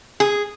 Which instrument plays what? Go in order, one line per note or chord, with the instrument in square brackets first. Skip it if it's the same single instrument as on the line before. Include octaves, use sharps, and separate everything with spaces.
[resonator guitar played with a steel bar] G#4